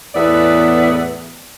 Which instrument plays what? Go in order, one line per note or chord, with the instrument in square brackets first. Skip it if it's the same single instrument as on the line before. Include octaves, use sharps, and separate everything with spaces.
[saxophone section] E2 A2 B3 B4 D5 E5